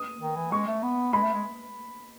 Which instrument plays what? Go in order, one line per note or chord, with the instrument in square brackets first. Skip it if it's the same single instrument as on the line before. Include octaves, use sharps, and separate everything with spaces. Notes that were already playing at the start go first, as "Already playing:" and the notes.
Already playing: [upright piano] D#6
[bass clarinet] D#3
E3
[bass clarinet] G#3 [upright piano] C#6
[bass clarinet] A3
B3
[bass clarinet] G#3 [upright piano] B5
[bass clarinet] A3
G#3